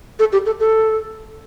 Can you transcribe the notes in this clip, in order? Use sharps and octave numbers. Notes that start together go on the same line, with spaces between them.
A4
G4
A4
A4